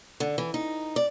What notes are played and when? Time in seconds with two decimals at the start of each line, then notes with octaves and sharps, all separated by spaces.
0.20 D3
0.38 E3
0.54 D#4
0.96 D5